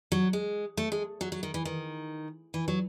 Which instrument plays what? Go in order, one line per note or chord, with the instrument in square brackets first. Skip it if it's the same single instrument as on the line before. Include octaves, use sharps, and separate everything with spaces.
[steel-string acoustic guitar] F#3
G#3
A3
G#3
F#3
F#3
D#3
E3
D#3
E3
F#3